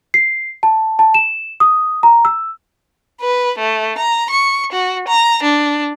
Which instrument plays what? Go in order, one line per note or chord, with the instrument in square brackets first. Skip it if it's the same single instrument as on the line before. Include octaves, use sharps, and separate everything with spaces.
[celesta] C7
A5
A5
E7
D#6
A#5
E6
[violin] B4
A3
A#5
C#6
F#4
A#5
D4